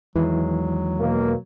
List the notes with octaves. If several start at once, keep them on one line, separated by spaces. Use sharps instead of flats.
E2 D#3 E3 F#3 G#3
B2 A#3